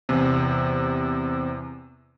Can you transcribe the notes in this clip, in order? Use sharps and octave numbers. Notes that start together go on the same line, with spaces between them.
E2 C3